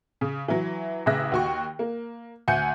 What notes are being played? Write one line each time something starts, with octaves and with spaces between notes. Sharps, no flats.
C#3
E3 F#3
A1 C#3 E5 F#6 A#6
D#2 F#4 C#6
A#3
D2 F#5 G#5 G6 C#7